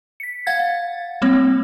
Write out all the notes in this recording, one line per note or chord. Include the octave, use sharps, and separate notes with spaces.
B6 C#7
F5 F#5 G#6 A6
G3 A#3 C4 C#5